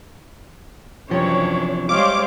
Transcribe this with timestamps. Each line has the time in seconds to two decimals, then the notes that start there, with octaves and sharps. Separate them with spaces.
1.11 F#2 C3 E3 F3 D4 C#5
1.89 G3 G#3 C5 C#5 F5 D6